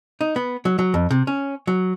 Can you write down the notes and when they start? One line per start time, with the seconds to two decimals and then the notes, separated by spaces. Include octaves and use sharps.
0.21 D#4
0.36 B3
0.65 F#3
0.79 F#3
0.94 F2
1.11 C3
1.27 C#4
1.67 F#3